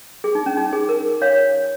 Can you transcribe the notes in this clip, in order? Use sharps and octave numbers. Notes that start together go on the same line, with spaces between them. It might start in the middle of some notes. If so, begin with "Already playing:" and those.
G#4
D#4
C#4
D#4
G#4
A#4
C#5 F5